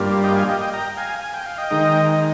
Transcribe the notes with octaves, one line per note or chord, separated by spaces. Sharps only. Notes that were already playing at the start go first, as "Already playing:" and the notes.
Already playing: G2 G3 A#3 F4
D#5 G5
F5 G#5
D#5 G5
D#5 G5
G5 A#5
F5 G#5
G#5
G5
F5
D#5 G5
D#3 G#3 D#4
D#5